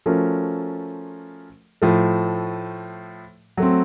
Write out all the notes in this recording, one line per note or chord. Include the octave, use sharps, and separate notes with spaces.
F3 A3 C#4 F#4 A#4
A2 F3 A3
F#3 A3 C4